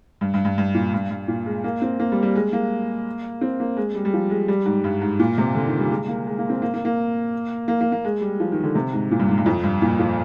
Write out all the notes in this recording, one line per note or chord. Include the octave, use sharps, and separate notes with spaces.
G2
G2
G2
G2
A#2
G2
G2
A#2
G#3
A#3
C4
A#3
G3
G3
G#3
A#3
C4
A#3
G#3
G3
G3
F3
G#3
G3
G#2
G2
G#2
A#2
C3
D3
D#3
G3
G#3
A#3
G#3
A#3
C4
A#3
A#3
A#3
A#3
A#3
A#3
G#3
G3
F3
D#3
D3
C3
G#2
A#2
G2
G#2
G2
F2
G2
A#2
F3